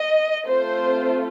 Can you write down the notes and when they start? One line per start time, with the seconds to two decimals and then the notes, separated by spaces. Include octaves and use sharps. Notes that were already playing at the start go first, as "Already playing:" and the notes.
Already playing: D#5
0.47 A3 C4 F4 A4 C5